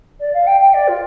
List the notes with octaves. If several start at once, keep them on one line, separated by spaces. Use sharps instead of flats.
D5
F5
G5
G5
D5
F4